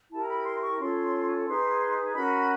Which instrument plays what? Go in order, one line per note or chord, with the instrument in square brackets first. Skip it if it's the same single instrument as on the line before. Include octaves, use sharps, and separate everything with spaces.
[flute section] E4 G4 A#4 A5
A#5
B5
C6
C#6
C#4 F4 A4 C#5 C6
D#4 G#4 B4 C6
C#4 F#4 A#4 B5